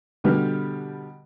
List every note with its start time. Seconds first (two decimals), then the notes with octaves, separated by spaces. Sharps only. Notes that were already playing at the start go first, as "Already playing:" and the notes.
0.24 B2 D3 G3 G4 B4 F6